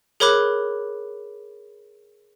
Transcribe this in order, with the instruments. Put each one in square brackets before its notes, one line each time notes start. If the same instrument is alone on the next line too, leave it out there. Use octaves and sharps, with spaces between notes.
[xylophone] G#4 A#4 C#5 B5 D6 F#6